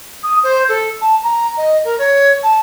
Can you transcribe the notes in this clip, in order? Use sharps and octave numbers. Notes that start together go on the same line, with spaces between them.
D#6
C5
A4
A5
A#5
D#5
A#4
C#5
A5